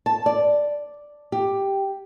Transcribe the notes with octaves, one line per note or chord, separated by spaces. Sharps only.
A5
D5
G4